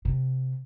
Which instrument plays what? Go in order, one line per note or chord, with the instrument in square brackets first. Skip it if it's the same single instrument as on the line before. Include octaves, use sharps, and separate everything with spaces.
[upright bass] C3